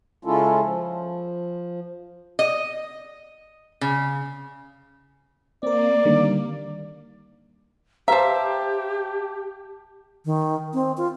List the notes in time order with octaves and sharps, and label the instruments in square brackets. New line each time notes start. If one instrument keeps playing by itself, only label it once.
[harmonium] C#3 G#3 C#4 E4 F4 A4
F3
[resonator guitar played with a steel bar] D#5
C#3
[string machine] A#3 [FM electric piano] C4 A#4 [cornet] D5
[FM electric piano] D3 D#3 G3
[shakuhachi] G4 [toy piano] B4 A#5 [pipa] C5 E5 [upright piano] F5 A5
[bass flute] D#3
C4
F4